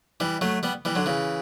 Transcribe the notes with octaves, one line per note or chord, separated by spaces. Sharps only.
E3 G3
F#3 A3
G3 B3
E3 G3
D3 F#3
C#3 E3